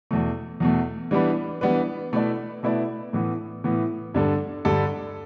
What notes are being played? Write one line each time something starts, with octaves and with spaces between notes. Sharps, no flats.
E2 B2 A3
E2 B2 A3
E3 G3 B3 D4 B4
E3 G3 B3 D4 B4
B2 A3 E4 B4 D5
B2 A3 E4 B4 D5
A2 E3 B3
A2 E3 B3
G2 D3 G3 D4 A4
G2 D3 G3 D4 A4